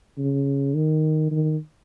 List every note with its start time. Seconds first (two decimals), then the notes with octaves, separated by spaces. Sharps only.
0.18 C#3
0.75 D#3
1.31 D#3